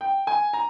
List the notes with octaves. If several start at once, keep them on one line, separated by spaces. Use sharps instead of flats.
G5
G#5
A#5